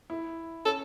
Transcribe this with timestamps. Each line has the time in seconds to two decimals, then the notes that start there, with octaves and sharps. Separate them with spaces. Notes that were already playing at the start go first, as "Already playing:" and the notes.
0.10 E4
0.65 C#4 A4